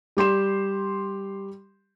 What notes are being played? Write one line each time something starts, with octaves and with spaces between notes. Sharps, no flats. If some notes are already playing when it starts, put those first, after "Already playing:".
G3 G4 C6 E7